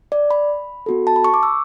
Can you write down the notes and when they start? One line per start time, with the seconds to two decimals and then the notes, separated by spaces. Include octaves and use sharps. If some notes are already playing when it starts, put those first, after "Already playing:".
0.12 D5
0.31 B5
0.86 B3 F#4 A4
1.07 A5
1.16 B5
1.25 C#6
1.34 D6
1.43 E6